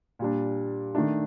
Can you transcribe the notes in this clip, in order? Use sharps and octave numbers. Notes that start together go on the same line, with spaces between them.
A#2 G3 D4
D#3 A3 D4